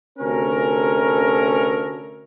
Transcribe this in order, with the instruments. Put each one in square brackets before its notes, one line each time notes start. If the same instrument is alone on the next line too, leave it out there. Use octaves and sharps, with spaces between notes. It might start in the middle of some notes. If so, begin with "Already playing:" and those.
[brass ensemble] D2 C3 C#4 A4 A#4